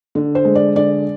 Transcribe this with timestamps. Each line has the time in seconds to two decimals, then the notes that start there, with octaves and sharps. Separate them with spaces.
0.15 D3
0.35 C5
0.45 G#3
0.55 D5
0.75 D3 D5